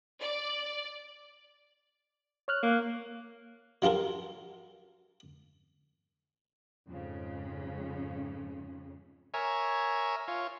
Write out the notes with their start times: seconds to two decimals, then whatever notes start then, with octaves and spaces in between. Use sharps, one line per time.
0.21 D5
2.48 C#5 F6 F#6
2.63 A#3
3.82 F#3 F4 G4 A4 A#4
6.88 F2 G#2 C#3
9.34 A#4 C#5 E5 G#5
10.28 F4 C#5